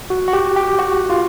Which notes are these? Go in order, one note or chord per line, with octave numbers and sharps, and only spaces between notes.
F#4
F#4
G4
G4
F#4
F4